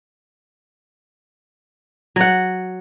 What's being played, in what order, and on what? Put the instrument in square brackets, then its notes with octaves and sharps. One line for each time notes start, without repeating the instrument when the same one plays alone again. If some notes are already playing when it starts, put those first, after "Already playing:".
[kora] F#3 F#5